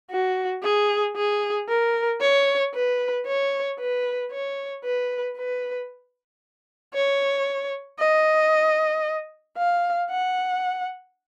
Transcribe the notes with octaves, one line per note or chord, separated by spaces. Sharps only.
F#4
G#4
G#4
A#4
C#5
B4
C#5
B4
C#5
B4
B4
C#5
D#5
F5
F#5